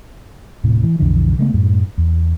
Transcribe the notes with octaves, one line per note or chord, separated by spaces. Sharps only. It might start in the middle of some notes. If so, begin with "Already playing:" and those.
D#1 A2 C3
E3
B1 F2 D3 E3
C#3 G#3 A3 B3
F#2 A2 G3
E2